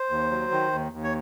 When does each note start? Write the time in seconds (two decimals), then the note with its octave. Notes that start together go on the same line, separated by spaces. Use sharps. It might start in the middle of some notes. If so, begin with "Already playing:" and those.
Already playing: C5
0.10 D#2
0.31 F#3
0.52 D#3
0.72 D#2
0.93 D#2
1.04 C#5